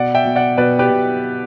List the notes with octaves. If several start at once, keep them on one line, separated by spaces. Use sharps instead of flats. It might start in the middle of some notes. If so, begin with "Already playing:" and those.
Already playing: B2 D5 F#5
E5 G5
B2
D5 F#5
B2 B4 D5
G4 B4
B2